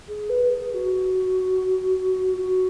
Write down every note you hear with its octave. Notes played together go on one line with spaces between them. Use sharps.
G#4
B4
G#4
G#4
F#4
F#4